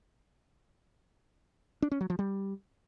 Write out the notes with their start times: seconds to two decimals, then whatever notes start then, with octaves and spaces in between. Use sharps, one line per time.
1.82 D4
1.92 C#4
2.01 F#3
2.10 F3
2.19 G3